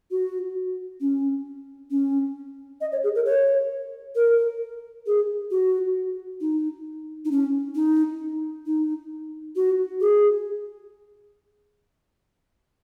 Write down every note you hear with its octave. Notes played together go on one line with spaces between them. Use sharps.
F#4
C#4
C#4
D#5
C#5
G#4
A#4
C#5
A#4
G#4
F#4
D#4
D#4
C#4
D#4
D#4
F#4
G#4